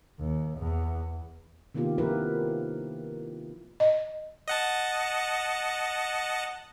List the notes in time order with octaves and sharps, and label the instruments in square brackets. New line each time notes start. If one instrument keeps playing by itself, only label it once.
[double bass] D#2
E2
[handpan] C3 D#3 A#3 B3 F4 G4
F3 E4 F4 G4 A#4 B4
[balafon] D#5
[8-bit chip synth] D#5 F#5 A5